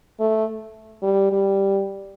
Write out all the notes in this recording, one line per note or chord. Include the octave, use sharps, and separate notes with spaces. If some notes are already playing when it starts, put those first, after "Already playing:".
A3
G3
G3